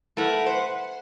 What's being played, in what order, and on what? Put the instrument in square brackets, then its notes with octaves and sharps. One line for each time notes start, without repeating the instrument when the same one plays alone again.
[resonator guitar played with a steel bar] A3 E4 A#4 [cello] B4 F#5
[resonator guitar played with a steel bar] C5